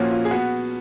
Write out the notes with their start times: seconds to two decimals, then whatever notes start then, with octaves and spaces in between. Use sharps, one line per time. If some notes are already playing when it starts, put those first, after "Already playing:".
Already playing: A#2 F3 A#3 C#4 F#4
0.11 F4
0.25 G#4
0.31 B3 F#4